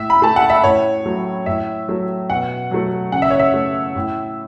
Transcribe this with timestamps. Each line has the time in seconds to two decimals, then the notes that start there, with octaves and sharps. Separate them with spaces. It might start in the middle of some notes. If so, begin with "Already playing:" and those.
Already playing: A2 E5
0.10 B5
0.22 A3 A5
0.36 F#5
0.50 E5
0.63 A2 C#5
1.06 F#3 A3
1.46 A2 E5
1.88 F#3 A3
2.30 B2 F#5
2.71 F#3 A3
3.12 C#3 F#5
3.22 E5
3.31 C#5
3.39 E5
3.54 A3
3.95 A2